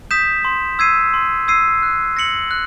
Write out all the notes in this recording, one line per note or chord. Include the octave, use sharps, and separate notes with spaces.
D#6 G6 B6 E7
C6
E6 G#6 C7 D#7
C6
E6 G#6 C7 D#7
F#6
A#6 C#7 F#7
F#6